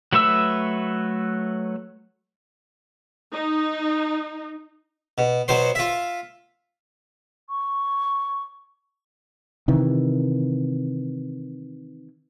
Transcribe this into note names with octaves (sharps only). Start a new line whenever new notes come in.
F#3 A3 B4 E5 E6
D#4
B2
B2 F#3 C5 C6
F4 E5
C#6
C3 D#3 E3